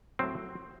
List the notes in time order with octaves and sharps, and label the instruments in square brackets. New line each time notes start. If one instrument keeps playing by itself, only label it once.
[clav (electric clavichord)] A2 F#3 C4